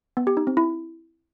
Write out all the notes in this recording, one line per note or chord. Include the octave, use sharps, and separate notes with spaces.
B3
G4
D#4
C4
E4